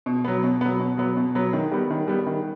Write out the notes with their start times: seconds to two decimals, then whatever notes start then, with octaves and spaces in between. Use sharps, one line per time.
0.06 B2
0.24 F#3 B3
0.43 B2
0.61 F#3 B3
0.80 B2
0.98 F#3 B3
1.16 B2
1.35 F#3 B3
1.53 D#3
1.71 G3 B3
1.90 D#3
2.08 G3 B3
2.27 D#3